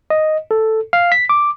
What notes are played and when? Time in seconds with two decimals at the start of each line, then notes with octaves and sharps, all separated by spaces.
0.10 D#5
0.51 A4
0.93 F5
1.12 B6
1.29 D6